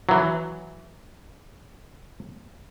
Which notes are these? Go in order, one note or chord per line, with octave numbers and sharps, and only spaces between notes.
E3 F#3